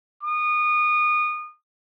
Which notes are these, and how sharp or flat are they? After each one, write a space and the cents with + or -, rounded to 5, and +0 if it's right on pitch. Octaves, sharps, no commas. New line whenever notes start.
D#6 -30